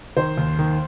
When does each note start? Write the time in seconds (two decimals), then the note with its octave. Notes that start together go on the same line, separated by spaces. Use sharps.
0.17 D#3 C5
0.38 D#2
0.59 D#3